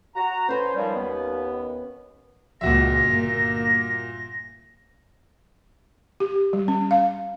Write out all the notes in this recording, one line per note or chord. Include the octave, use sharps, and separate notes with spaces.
F#4 A#5
C#4 B4 C5 G#5
D#3 F3 G3
D#2 B3
C#2 A#2 F#4 E5 A#6
G1 A#3
G4
G3
C#4
F5